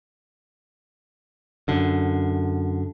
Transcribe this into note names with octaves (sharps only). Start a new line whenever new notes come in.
F#2 D3